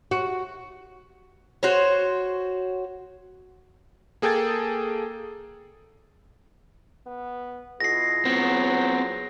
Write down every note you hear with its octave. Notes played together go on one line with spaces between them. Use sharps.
F#4
F#4 C5 C#5
A#3 G#4 A4 G5 G#6 A6
B3
B2 E4 F4 G#4 A#6 C7
F#3 B3 C4